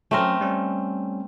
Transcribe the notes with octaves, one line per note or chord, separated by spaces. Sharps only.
F#3 A3 C4 C#4 A#4
G3 C#4